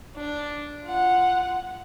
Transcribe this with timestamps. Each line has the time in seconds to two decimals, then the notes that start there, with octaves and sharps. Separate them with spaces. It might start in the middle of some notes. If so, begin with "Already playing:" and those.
0.16 D4
0.84 F4 F#5